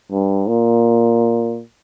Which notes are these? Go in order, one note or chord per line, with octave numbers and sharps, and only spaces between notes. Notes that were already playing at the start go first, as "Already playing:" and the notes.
G2
A#2